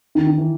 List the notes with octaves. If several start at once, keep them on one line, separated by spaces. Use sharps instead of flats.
D#3
D#3
E3